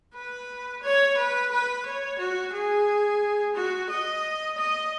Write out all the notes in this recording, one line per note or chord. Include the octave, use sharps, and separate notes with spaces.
B4
C#5
B4
B4
C#5
F#4
G#4
F#4
D#5
D#5